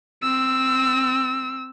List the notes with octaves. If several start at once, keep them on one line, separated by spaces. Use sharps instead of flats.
C4 E6